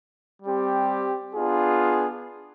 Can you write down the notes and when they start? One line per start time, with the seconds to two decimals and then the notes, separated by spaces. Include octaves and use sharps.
0.42 G3 C4 G4
1.34 B3 D4 F4 G#4